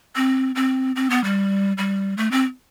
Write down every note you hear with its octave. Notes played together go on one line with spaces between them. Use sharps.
C4
C4
C4
B3
G3
G3
A3
C4